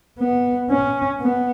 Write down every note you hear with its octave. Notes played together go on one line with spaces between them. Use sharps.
B3
C#4
B3